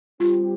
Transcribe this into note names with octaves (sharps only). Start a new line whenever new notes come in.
G3 C4 F4 G4